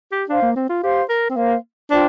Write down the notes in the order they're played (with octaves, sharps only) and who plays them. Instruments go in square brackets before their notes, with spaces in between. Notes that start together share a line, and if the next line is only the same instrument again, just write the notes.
[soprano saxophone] G4
[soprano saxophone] D4 [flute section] C5 F5 C6
[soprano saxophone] A#3
C4
F4
[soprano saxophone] G4 [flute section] C5 F5 C6
[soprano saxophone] A#4
C4
[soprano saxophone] A#3 [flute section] C5 F5 C6
[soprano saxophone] D4 [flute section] F4 C5 G5